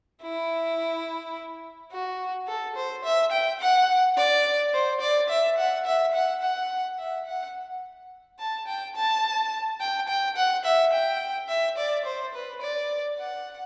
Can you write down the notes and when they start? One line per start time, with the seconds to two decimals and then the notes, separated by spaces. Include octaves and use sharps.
0.22 E4
1.91 F#4
2.48 A4
2.76 C5
3.05 E5
3.32 G5
3.61 F#5
4.17 D5
4.73 C5
5.01 D5
5.30 E5
5.58 F#5
5.86 E5
6.14 F#5
6.42 F#5
6.99 E5
7.26 F#5
8.39 A5
8.68 G5
8.96 A5
9.80 G5
10.08 G5
10.37 F#5
10.65 E5
10.93 G5
11.49 E5
11.77 D5
12.05 C5
12.34 B4
12.62 D5
13.19 F#5